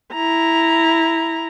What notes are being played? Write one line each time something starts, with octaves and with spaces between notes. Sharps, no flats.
E4 A#5